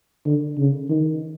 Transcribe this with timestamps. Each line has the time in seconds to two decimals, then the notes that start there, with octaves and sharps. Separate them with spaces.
0.26 D3
0.58 C#3
0.89 D#3